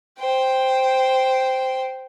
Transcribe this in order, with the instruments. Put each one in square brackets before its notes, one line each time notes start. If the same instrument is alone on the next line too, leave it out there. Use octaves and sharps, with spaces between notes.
[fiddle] C5 G5